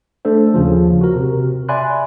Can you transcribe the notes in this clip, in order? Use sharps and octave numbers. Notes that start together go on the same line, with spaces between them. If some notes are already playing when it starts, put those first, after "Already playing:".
A3 D4 A4 C5
D#2 C#3 F3
F#4 A#4
C3
D5 E5 G#5 B5 C6 F#6